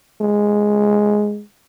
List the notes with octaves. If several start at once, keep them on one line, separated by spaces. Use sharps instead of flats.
G#3